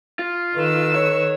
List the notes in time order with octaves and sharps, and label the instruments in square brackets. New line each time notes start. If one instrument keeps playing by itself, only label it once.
[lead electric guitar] F4
[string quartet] D#3 E6 [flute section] A4 B4
[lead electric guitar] C#5